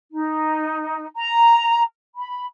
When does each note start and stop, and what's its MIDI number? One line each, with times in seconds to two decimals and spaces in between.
0.12 1.06 63
1.17 1.83 82
2.17 2.45 83